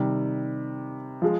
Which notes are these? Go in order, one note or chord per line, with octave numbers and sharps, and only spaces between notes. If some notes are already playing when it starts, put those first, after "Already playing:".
Already playing: C3 D#3 G3
F3 G#3